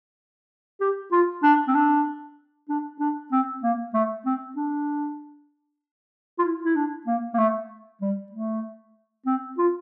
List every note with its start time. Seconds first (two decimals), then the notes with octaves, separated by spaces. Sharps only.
0.80 G4
1.12 F4
1.43 D4
1.68 C4
1.75 D4
2.69 D4
3.00 D4
3.32 C4
3.63 A#3
3.94 A3
4.25 C4
4.57 D4
6.39 F4
6.44 E4
6.64 E4
6.76 D4
7.07 A#3
7.34 A#3
7.38 A3
8.02 G3
8.32 A3
9.26 C4
9.58 F4